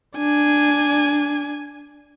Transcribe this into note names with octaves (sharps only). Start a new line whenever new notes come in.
D4 G#5